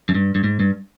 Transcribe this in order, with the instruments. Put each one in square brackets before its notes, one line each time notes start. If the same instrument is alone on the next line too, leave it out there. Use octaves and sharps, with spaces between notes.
[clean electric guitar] F#2
G2
G2
G#2
G2